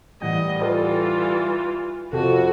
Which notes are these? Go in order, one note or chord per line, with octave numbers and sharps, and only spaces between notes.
A2 E3 G3 D#5 F#5
E3 F4 G4 A4 B4
F2 C3 F#4 G4 A4